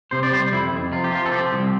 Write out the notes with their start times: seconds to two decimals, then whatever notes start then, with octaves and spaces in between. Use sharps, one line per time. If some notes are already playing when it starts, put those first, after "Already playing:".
0.11 C3 C5
0.23 D5
0.32 G3 C5
0.52 F2 E4
0.72 F2
0.92 C3 F4
1.04 G4
1.12 F3 F4
1.26 A4
1.32 C4 G4
1.53 C2